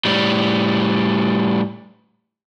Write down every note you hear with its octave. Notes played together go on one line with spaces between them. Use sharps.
A2 G3